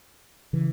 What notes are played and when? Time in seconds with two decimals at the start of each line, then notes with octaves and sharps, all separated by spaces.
0.53 C#3 E3